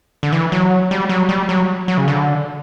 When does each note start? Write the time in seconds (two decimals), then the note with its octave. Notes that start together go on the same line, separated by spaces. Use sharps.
0.23 D3
0.33 E3
0.52 F#3
0.91 G3
1.09 F#3
1.29 G3
1.49 F#3
1.88 F#3
1.98 C#3
2.08 D3